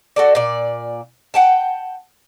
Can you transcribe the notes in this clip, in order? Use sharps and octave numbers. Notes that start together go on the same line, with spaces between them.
F#4 A4 D5
A#2 D5
F#5 G5 A5